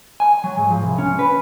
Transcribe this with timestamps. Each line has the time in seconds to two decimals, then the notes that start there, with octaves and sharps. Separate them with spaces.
0.20 G#5
0.44 F#3
0.58 G#2
0.70 F3
0.83 C2
0.98 C#4
1.19 B4